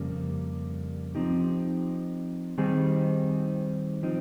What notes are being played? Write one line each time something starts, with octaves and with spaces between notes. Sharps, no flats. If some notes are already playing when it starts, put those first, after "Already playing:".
Already playing: F2 C#3 G3 A#3
F3 C4 D#4 G4
D#3 G3 C4 D#4 G#4
F3 C4 D#4